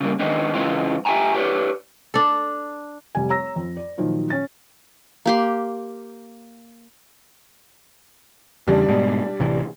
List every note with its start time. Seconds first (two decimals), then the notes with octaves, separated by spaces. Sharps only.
0.01 C#3 G3 A#3
0.19 D#3 G#3 B3 C4 D4 D#4
0.54 G#2 C#3 E3 G#3 C4 F4
1.05 G4 E5 G5 G#5 A#5
1.34 G4 B4 C#5 D5
2.14 D4 A4
3.15 F1 G3 G#5
3.30 C#5 A#5 E6 A#6
3.56 F2
3.77 D5
3.98 A#2 D#3 F3 F#3
4.30 C#4 A6
5.26 A#3 G4 C6
8.67 E2 C#3 G3 D4
8.88 G#2 B2
9.40 A1 C3 E3